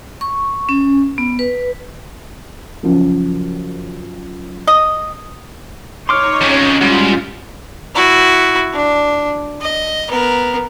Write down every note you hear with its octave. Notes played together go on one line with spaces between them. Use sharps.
C#6
C#4
B3
B4
F#2 C#3 F3
D#5
D#4 C#5 C6 D6 F6
F2 G#3 C#4
G#2 G3 F4 F#4
E4 F#4
D4
D#5
B3 A#4